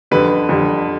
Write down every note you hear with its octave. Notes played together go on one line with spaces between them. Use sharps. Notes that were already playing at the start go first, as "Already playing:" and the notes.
F2 D3 G3 B4
F2 D3 G3